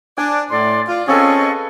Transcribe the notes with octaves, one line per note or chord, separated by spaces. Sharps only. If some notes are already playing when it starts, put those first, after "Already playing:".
D4 D5 G#5
A2 D5 C6
F4 D5
C4 C#4 F4 G#4 A4 B4 D#5 C#6